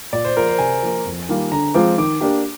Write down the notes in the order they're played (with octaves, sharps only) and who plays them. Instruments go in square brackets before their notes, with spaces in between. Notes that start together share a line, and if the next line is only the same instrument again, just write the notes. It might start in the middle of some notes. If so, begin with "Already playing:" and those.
[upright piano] A#2 [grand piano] D5
[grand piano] C5
[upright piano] F3 A#3 F4 G#4 [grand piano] A#4
[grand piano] C5
[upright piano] C3 [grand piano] G#5
[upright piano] F3 A#3
F2
D#3 G3 A#3 F4
[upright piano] D3 [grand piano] A#5
[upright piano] F3 G#3 C4 F4 [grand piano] D6
[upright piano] D#3 [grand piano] D6
[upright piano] A#3 D4 G4